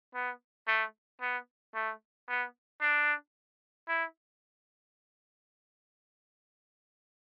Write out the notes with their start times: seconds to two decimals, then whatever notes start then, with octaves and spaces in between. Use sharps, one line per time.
0.15 B3
0.68 A3
1.22 B3
1.75 A3
2.29 B3
2.82 D4
3.88 E4